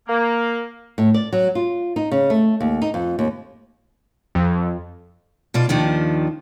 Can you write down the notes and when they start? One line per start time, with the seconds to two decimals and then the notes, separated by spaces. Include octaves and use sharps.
0.07 A#3
0.98 A2
1.14 D5
1.33 F#3
1.55 F4
1.96 D#4
2.11 C#3
2.30 A3
2.60 D#2
2.82 D#4
2.94 F2
3.19 D#2
4.35 F2
5.54 B2 F4 D5
5.69 D#2 D#3 F3 D4